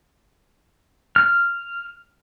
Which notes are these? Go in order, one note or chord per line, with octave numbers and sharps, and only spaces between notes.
F6